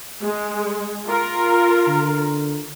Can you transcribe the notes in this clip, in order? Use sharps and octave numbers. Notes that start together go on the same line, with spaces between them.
G#3
F4 A#4
D3